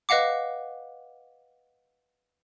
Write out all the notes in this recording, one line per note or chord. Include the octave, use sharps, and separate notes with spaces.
B4 D#5 F5 F#5 D6